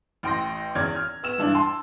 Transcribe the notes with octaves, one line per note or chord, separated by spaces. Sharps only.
A1 G5 C6 A#6
E2 C#4 D5 F6 G#6
F6
B3 E6 E7
G2 E3 D4
A5 C6 E6